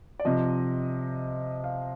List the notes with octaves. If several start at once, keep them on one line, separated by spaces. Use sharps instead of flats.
D5
C3 F3 D#5
F5